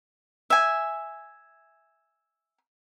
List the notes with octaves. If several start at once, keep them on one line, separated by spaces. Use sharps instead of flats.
E5 G#5